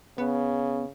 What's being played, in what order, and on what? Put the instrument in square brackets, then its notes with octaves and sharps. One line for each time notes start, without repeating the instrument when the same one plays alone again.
[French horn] C#3 [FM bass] B3